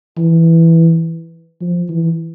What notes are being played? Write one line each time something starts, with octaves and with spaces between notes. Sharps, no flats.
E3
F3
E3